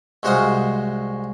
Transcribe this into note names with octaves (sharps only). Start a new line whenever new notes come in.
C2 G#3 F#4 C5 F5 D#6